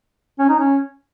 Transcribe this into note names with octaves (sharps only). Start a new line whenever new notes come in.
C#4
D#4
C#4